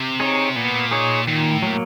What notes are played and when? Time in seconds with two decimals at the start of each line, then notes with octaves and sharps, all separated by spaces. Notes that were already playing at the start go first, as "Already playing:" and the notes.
Already playing: C3
0.20 D#4 G#4 C#5
0.56 A#2 B3
0.91 D#4 G#4 C#5
1.27 A#2 D#3
1.52 A2
1.62 F#3 A#3